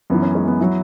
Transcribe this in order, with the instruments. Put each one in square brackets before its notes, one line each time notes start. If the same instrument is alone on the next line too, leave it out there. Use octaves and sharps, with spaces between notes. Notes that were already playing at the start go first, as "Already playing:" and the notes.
[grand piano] F#2 B3
E3
C#4
G#3
B3
F#3 E4